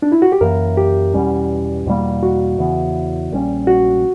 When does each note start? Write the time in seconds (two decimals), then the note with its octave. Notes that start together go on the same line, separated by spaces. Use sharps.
0.02 D4
0.12 E4
0.22 F#4
0.32 G4
0.41 F#2 E3 A#3 A#4
0.77 G4
1.14 E2 B2 G3 C#4
1.86 E2 B2 G3 A#3
2.22 F#4
2.58 E2 C#3 E3 B3
3.31 A#1 A#2 G3 C#4
3.67 F#4